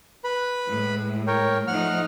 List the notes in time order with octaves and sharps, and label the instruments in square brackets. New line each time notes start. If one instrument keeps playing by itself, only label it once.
[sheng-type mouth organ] B4 B5
[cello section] A2 G#3
[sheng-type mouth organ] A#4 C#5 G5
[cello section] F3 A3 D#4 [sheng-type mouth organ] F#5 F6